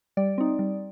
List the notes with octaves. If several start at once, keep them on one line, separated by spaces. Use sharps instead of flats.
G3 D5
C4 D#4
G3